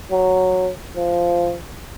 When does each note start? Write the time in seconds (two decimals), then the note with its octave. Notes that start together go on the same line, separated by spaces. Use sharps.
0.11 F#3
0.96 F3